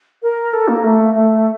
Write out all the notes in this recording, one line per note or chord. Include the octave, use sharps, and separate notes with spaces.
A#4
A4
A#3
A3
A3